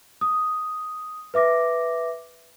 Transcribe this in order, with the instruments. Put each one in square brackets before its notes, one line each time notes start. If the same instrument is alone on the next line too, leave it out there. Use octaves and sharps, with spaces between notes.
[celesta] D#6
B4 E5 D6 A#6